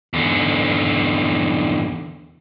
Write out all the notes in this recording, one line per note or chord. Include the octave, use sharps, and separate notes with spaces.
E2 D3